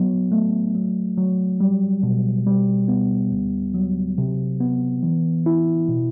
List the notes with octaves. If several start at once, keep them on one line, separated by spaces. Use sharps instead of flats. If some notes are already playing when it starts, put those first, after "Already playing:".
Already playing: F#3 B3
A3
F#3
F#3
G3
B2
G3
B3
D2
F#3
C3
B3
E3
E4
B2